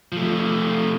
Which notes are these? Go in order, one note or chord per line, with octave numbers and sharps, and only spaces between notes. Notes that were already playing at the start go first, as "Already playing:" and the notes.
F3 A3